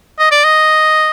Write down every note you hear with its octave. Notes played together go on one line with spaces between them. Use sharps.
D#5
D5
D#5